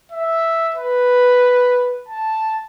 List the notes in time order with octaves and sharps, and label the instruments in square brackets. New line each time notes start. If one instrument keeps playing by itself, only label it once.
[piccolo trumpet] E5
B4
A5